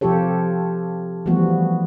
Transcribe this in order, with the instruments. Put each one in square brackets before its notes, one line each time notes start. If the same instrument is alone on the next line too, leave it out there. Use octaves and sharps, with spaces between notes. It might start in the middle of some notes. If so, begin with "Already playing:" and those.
[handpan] C3 F3 F4 G4 A4 C#5
E3 F3 G3 A3 B3 F#4